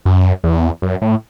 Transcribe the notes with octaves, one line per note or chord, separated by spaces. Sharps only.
F#2
E2
F#2
A2